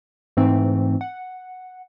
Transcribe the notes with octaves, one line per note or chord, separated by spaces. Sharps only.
G#2 E3 A3 C4
F#5